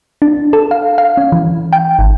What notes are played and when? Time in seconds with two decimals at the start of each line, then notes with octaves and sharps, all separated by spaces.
0.22 D4
0.53 A4
0.71 F5
0.98 F5
1.17 C#4
1.32 E3
1.73 G5
1.99 G#1